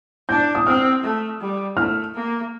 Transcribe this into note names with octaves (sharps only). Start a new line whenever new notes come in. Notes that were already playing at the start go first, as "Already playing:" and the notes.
D4 G6
D#6
C4 F6
A3
G3
A3 F6
A#3